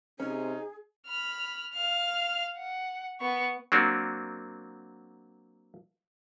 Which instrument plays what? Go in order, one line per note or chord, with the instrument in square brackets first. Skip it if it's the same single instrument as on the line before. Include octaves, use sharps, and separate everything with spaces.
[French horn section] C3 C4 [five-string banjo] C#4 [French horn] D#4 [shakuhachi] G#4
[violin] B5 F6
F5 F6
F#5
B3 C#6
[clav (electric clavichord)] F#3 A#3 C4 D4 F#4